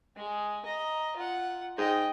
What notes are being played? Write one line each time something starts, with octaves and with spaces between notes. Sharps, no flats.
G#3 G#4
D#5 A#5
F4 F#5
G#2 D#5 G5